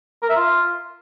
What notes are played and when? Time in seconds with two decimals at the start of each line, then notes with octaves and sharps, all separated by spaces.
0.23 A#4
0.29 E5
0.36 F4